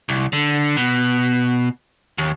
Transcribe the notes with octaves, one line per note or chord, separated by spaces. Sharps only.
C2
D3
B2
D#2